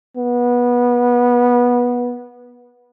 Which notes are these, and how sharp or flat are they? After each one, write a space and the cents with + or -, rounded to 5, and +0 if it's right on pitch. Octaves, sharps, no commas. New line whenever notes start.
B3 -20